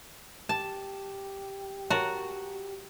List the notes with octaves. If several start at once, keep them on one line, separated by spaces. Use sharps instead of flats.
G4 A5
F#4 A#4 C#5 A5